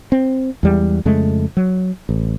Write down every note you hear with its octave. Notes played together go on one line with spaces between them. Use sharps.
C4
E2 G3 G#3
F2 C#3 G#3 A3
F#3
A1